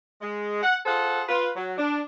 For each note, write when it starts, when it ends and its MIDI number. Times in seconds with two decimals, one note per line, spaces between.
0.21 0.61 56
0.63 0.77 78
0.86 1.22 65
0.86 1.22 68
0.86 1.22 69
0.86 1.22 72
0.86 1.22 78
1.29 1.49 65
1.29 1.49 71
1.56 1.73 54
1.78 2.01 62